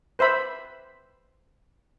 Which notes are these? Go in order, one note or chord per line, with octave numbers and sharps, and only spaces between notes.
B4 C5 E5 B5